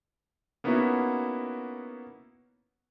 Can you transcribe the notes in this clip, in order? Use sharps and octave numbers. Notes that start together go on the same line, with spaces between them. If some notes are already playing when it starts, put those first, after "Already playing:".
A#3 B3 C#4 D#4 E4 F#4